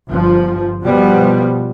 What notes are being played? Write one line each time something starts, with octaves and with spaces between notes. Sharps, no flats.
G1 F3
B2 F3 G3 B3